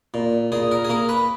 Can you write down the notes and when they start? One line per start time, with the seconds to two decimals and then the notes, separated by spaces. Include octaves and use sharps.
0.14 A#2
0.52 A#2 G#4
0.71 A#4
0.84 G#4
0.89 A#3 A#4
1.09 B4